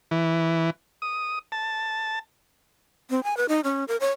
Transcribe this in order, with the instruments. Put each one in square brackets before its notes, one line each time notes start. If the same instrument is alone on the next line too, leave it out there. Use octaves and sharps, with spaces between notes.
[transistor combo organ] E3
D#6
A5
[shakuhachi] C4
G#5
B4
D#4
C#4
A#4
C#5